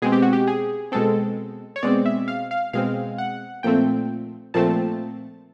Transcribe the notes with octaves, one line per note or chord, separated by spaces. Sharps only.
B2 G#3 C4 G#4
G4
F#4
G4
G#4
B2 G#3 C4 A4
C#5
B2 G#3 C4 D5
E5
F5
F5
B2 G#3 C4 F5
F#5
A#2 F3 A3 C4 G5
A#2 F3 A3 C4 A5